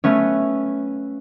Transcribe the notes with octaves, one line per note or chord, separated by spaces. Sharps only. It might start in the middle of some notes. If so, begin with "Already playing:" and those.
A3 B3 C#4